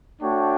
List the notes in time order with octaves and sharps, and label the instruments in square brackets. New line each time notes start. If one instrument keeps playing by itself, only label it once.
[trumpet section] A3 D4 F#4 C#5 G5